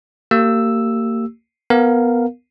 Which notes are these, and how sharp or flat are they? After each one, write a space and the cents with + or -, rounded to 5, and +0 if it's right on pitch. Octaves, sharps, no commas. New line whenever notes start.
A#3 -30 G4 -20 E6 +0
B3 +0 A#4 -5 F5 +15